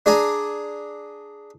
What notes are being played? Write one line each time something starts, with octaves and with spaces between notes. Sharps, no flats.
D4 G#4 D5 G#5 A#5